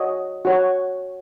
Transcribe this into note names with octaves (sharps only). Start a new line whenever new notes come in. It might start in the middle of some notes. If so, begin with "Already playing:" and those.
Already playing: F#4 C#5 D#5
F#4 C#5